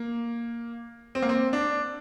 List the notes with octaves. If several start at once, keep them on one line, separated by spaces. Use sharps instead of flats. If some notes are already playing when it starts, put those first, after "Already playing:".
Already playing: A#3
C4
A#3
C4
D4